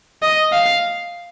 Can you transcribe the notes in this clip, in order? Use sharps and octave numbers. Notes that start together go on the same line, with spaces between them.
D#5
F5